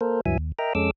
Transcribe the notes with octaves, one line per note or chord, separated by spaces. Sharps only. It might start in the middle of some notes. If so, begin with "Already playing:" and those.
A#3 A4 A#4 C5
D2 G2 E3 F#3 E5 G#5
D#2
A#4 D#5 E5 G5 A#5
F2 G#3 C#4 A4 D6 E6